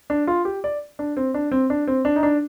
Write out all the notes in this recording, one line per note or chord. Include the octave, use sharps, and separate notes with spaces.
D4
F4
G4
D5
D4
C4
D4
C4
D4
C4
D4
D#4
D4